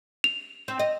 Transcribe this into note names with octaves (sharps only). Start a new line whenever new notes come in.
F7
C4
D#5